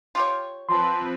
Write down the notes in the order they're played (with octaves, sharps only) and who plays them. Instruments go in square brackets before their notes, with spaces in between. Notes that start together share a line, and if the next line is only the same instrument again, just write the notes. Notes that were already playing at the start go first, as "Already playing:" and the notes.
[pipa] F4 G4 C#5
[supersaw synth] F3 C4 B4 [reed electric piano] A5 C6